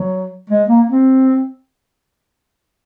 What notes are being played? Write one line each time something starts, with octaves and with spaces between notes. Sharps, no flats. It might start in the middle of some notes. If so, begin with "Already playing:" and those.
Already playing: F#3
G#3
A#3
C4